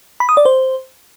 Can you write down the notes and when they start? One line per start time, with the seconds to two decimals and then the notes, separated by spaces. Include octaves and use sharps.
0.20 B5
0.29 D#6
0.37 D5
0.45 C5